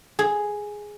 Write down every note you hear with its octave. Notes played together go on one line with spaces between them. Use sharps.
G#4